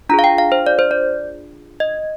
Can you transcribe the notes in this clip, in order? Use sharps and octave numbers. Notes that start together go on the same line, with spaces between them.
D4 F4 G#4 A#5
F5
G5
F5
C5
D5
C5
D5
D#5